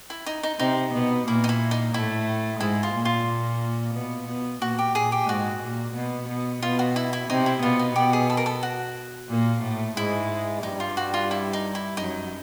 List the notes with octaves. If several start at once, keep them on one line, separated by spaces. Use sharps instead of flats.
E4
D#4
D#4
C3 C4 D#4
B2 B3
A#2 A#3 E4
D#4
E4
D#4
A2 A3 E4
G#2 G#3 E4
F4
A#2 A#3
F4
B2 B3
B2 B3
A#2 A#3 F#4
G4
A#2 A#3 G#4
G4
G#2 G#3 F#4
A#2 A#3
B2 B3
B2 B3
B2 B3 F4
F#4
E4
E4
C3 C4 D#4
E4
B2 B3 F4
D#4
B2 B3 G4
G#4
A4
A#4
A4
F#4
A#2 A#3
A2 A3
G#2 G#3 E4
G2 G3 D#4
F4
F#4
F4
E4
D#4
E4
F#2 F#3 D#4